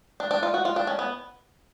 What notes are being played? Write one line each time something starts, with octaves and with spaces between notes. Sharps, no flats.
D4
D4
F4
F#4
F4
D4
C#4
B3